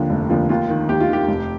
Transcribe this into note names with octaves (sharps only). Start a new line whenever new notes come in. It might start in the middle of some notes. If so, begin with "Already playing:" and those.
Already playing: D#2 D3 F3
F1
D#2 D3 F3
D#2 F4
D#3
D#2 G4
F4
D#3 G4
F1